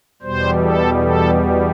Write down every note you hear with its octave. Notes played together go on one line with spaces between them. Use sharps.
E2 B2 G3 C5
A4
A4